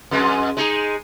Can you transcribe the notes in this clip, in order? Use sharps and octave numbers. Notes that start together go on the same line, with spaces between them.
F2 G#3
G#3 D#4 G#4